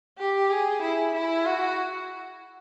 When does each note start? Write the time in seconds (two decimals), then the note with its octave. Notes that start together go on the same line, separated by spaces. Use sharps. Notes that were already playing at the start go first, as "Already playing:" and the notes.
0.18 G4
0.50 G#4
0.82 E4
1.14 E4
1.46 F#4